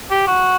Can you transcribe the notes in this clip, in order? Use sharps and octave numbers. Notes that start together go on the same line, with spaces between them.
G4
F#4